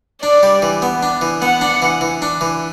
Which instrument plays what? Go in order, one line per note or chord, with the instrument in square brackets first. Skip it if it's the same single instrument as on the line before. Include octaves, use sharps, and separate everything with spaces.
[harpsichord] D4 [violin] D5
[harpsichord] G3
E3
B3
D4
E3
[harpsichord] B3 [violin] F#5
[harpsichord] D4
E3
E3
D4
E3